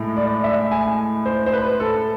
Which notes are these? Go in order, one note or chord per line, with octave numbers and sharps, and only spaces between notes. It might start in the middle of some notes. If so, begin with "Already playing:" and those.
Already playing: A2 G#3
D5
E5
G#5
C5
C5
B4
A4